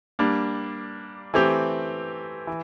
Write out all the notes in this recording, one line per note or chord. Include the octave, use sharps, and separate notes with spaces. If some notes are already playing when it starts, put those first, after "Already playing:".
G3 A#3 D4
E3 A3 C4 G4
E3